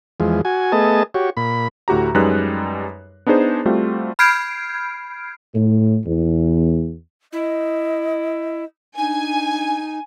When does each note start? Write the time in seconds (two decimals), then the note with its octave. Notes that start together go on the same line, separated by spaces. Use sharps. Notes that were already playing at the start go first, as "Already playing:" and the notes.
0.20 E2 F3 G#3
0.45 F#4 G#5
0.72 A3 B3 G#4 D#5 A5
1.14 F#4 G4 C#5
1.37 A#2 B5
1.88 D2 A2 F#4 G4 A#5
2.15 F#2 G3 G#3 D#4 B4 F#6
3.27 B3 D4 D#4 G#4 C5
3.65 G3 A3 C4 F4 F#4
4.19 B5 F6 G6 G#6 C7 D7
5.54 A2
6.06 E2
7.33 E4 D#5
8.98 D4 D#4 G#5